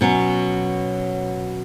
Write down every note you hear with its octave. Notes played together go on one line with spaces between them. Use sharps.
B2 F#3 C#4